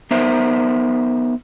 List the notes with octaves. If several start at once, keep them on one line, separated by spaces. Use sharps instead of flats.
B3 D#4 A#4 C5 E5